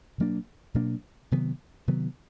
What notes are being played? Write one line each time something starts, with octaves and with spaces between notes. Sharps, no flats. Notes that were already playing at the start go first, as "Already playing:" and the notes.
B2 F#3 A#3 D4
B2 F#3 A#3 D4
C3 D#3 F#3 B3
C3 D#3 F#3 B3